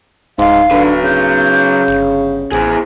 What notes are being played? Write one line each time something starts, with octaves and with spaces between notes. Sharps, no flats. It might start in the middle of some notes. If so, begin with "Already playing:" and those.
D1 G#2 F5
D3 F#3 B4
C#3 G6
G1
A1 E4 G#4 C5